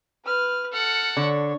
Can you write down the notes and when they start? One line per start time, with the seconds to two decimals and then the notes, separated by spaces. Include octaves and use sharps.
0.25 B4 F6
0.72 A4 F#5 F6
1.17 D3 C#5